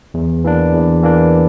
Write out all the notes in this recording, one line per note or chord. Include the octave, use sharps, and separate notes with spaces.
E2
E3 A#3 D4
E2
E3 A#3 D4